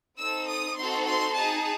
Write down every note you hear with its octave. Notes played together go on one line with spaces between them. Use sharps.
C4 D#4 A4 E6
D#6
C4 D#4 F#4 A4 C6
C6
D#4 G#4 A5